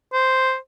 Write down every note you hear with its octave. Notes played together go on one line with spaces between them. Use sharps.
C5